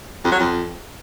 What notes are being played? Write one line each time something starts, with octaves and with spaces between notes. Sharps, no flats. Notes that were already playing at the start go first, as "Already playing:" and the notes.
F2
F#3
F2